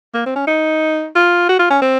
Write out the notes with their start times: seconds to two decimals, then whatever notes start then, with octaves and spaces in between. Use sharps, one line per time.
0.14 A#3
0.26 C4
0.36 C#4
0.47 D#4
1.15 F4
1.49 F#4
1.59 F4
1.70 C#4
1.82 C4